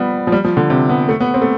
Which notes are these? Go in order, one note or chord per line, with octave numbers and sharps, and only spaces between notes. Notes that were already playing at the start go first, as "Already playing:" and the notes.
Already playing: F3 G3 B3
F3
G3
F3
D3
C3
B3
A3
B3
C4
A3